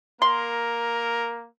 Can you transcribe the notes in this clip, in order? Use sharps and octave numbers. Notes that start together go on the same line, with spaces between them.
A#3 A#4 C6